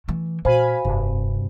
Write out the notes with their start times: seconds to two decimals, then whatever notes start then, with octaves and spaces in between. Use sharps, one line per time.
0.08 E3 A3
0.45 A#2 F#4 C5 F5 G#5 B5
0.85 F1 G2 C3